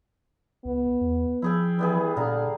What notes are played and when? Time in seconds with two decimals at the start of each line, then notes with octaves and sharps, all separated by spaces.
0.65 C#2 B3
1.01 E2
1.42 F3 E4 G#4 G5
1.79 E3 G3 B3 G#4
2.16 A#2 D3 F5 A#5